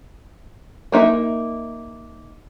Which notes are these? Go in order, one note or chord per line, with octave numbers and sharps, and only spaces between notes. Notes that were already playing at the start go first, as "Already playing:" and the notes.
A#3 D#4 E5